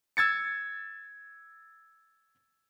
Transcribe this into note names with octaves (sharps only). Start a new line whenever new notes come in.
E6 G#6 A6 C#7